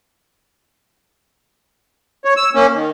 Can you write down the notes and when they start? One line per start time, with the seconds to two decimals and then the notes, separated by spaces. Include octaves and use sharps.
2.25 C#5
2.37 E6
2.55 A#3 C#4
2.74 D#3